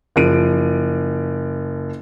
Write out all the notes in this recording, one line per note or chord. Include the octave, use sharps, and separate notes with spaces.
F#1 F3 D7 D#7